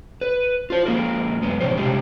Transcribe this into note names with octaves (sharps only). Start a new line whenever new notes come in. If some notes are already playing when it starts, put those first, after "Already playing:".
B4
F4 C5
F3 G#3 A#3 F4 F#4 A#4
F#2 G#3 B3
E2 G#2 B2 F3 C5
C3 G3 G#3 G4